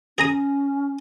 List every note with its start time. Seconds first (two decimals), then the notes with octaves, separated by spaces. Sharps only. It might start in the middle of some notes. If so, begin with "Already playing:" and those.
0.18 C#4 G#4 A#5 D#6